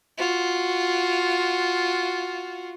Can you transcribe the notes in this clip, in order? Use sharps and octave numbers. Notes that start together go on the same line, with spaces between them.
F4 F#4